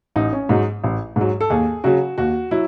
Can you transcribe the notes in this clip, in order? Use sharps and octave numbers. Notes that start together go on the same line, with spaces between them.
A1 D#4
C#4
G#2 F#3 D#4
A1
G#2 F#3
A4
D#2 G#4
C#3 F#3 F#4
D#2 F#4
F#3 E4